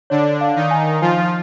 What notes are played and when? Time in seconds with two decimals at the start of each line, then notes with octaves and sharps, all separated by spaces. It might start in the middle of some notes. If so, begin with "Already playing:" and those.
0.10 D3 D4 C#5
0.41 F5
0.56 D#3 D#4
0.71 G#5
1.01 F3 F4 G#5